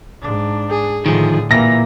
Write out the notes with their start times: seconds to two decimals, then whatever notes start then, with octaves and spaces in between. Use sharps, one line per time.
0.22 G#2 D4
0.70 G#4
1.06 A2 D3 D#3 F3 G#4
1.51 A#2 E3 A#3 A#6